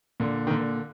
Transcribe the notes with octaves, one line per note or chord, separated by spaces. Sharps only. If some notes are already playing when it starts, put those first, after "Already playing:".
A#2 D3
D#3
A#2 D3